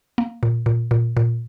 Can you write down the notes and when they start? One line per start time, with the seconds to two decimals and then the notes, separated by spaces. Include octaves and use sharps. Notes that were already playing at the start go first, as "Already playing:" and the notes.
0.18 A#3
0.43 A#2
0.66 A#2
0.91 A#2
1.17 A#2